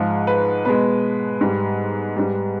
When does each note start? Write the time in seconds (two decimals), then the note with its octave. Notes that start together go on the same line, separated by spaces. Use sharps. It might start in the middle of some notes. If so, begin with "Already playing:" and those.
Already playing: G#2 F3 G#3
0.27 B4
0.65 B2 G#3 B4
1.41 G#2 G3
2.16 G#2 G3